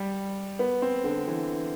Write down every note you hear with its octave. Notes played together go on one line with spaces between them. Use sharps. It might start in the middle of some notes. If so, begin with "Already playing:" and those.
Already playing: G3
B3
C4
D3
E3